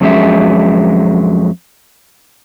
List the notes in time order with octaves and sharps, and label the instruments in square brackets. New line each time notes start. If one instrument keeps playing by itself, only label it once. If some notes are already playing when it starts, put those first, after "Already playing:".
[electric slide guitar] F2 C3 F#3 G#3 C#4 E5